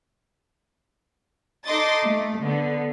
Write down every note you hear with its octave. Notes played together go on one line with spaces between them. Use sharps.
D#4 A4 D#5 C6 D6 A6
A3
D3 B3